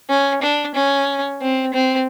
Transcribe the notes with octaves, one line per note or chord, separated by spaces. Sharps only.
C#4
D4
C#4
C4
C4